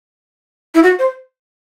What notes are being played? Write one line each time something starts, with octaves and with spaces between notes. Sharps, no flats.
E4
F#4
C5